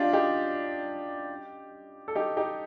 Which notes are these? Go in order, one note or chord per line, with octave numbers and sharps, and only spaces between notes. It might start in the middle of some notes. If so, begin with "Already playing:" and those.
Already playing: D4 D#4 F4 G4
D#4 G4
A4
D#4 G4
D#4 G4